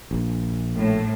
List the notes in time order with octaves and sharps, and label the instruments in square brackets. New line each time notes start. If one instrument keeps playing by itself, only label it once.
[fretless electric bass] A#1
[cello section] A2